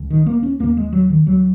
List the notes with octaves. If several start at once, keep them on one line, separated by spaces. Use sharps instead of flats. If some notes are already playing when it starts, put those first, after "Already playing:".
Already playing: C#2 C#3
D#3
A#3
C#4
D#2 C#3 A#3
G#3
F#3
D#3
C#2 C#3 F#3